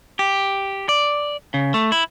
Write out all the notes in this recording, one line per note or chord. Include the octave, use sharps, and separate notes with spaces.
G4
D5
C#3
A3
E4